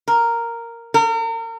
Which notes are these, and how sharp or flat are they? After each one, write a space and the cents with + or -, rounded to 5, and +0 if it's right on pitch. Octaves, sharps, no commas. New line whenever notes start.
A#4 -5
A#4 -35